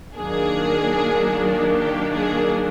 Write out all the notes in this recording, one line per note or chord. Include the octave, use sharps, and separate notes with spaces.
D#3 F#3 A#3 D4 G#4
G4
G#4